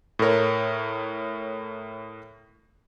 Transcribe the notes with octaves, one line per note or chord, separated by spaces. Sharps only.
A2 A4 A#4 C#5